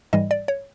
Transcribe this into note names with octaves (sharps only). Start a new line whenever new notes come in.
G#2 E3 G3 D#5
D5
C#5